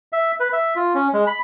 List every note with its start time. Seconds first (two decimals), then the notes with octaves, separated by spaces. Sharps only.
0.13 E5
0.40 B4
0.53 E5
0.76 F4
0.94 C#4
1.14 G#3
1.27 B5